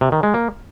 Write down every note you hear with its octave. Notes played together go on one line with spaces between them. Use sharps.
C3
D#3
G#3
A#3